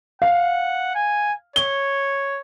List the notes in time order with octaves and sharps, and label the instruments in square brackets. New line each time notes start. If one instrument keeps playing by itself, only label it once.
[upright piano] F5 [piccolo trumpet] F#5
[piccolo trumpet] G#5
[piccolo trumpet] C#5 [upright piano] G7